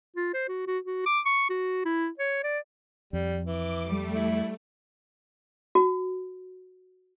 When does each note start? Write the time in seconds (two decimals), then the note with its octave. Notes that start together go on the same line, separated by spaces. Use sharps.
0.16 F4
0.34 C5
0.49 F#4
0.67 F#4
0.85 F#4
1.06 D6
1.26 C#6
1.50 F#4
1.85 E4
2.19 C#5
2.44 D5
3.13 F2 G3
3.45 E3 D6
3.84 G3 A3
4.15 E4
5.75 F#4